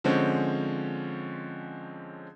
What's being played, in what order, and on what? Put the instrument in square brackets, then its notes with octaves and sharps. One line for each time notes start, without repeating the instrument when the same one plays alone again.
[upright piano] D3 F3 G#3 C4 C#4